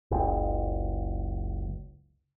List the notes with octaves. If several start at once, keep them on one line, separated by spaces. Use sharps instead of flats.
F#1 C#2